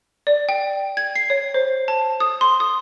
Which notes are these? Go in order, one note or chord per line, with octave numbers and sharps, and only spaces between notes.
D5
G5
G#6
C7
C#5
C5
A5
D#6
C6
D#6